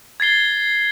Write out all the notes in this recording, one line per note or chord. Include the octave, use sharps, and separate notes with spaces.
G#6 A6 C7 G7